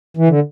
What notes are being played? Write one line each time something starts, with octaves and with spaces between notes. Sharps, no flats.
E3
D3